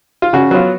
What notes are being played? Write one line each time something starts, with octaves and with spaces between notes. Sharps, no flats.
F4
C#3 F#4
F#3 B3 F4